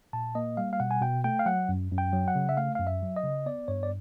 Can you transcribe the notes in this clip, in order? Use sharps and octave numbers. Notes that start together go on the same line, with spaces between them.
A#2 A5
A#3 D#5
G3 F5
F5
B2 F#5
G#5
B2 G5
A3 G5
F5
F#3 F#5
F#2
F#2
G5
F#3
F#5
C#3
E5
A3 F5
F#2 F5
E5
F#3
D#5
C#3
B3 D5
G2 C#5
D5